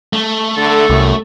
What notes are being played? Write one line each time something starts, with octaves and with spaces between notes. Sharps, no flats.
A3
D3 A4
C2 F#2